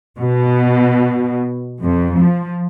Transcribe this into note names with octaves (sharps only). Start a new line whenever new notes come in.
B2
F2
F3